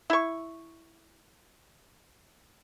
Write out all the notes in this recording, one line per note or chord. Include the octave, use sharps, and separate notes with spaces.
E4 C#6